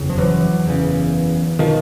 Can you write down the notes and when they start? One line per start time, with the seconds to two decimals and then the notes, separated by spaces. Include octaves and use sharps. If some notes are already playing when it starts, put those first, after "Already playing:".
Already playing: F#1 E2 C#3
0.10 F3
0.18 E3 F#3
0.66 F#1 E2 C#3
1.59 B2 D#3 F3